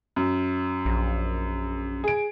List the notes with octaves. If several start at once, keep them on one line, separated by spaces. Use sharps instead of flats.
F#2
A#1
G#4 D7